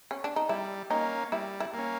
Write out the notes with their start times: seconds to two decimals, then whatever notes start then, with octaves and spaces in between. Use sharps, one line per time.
0.11 C#4
0.24 D4
0.36 D#4
0.49 G3 E4
0.90 A#3 C#4 D#4
1.32 G3 E4
1.60 E4
1.74 A#3 C#4